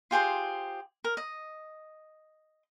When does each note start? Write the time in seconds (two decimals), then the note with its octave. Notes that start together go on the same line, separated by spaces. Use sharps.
0.11 F4 G4 G#4 C5
1.04 A#4
1.17 D#5